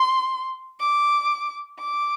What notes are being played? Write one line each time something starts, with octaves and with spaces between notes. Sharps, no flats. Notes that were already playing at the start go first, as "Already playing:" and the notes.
Already playing: C6
D6
D6